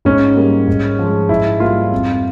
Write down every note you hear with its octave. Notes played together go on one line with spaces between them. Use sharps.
G#2 C#4
G3 A#3
G#2
F3 G#3
G#2 E4
G3 A#3 F4
F2